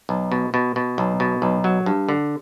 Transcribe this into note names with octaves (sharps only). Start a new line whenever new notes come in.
B1
B2
B2
B2
B1
B2
B1
F#3
G2
D3